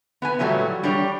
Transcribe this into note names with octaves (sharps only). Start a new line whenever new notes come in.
B3 B4 G#5
A#2 E3 F#3 G3 A3
G3 D4 G4 C#5